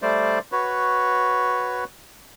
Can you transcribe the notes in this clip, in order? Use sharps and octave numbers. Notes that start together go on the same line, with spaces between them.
G3 A3 C5 D5
F#4 B4 C#5